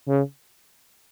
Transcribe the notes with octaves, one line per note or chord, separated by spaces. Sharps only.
C#3